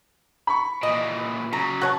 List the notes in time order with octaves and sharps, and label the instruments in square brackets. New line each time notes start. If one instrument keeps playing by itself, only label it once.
[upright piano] B5 C#6
[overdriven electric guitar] A#2 E3 [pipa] D#5
[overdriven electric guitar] C#3 F#3 [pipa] A#5
[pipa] F#4 C#5 A5 [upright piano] F#6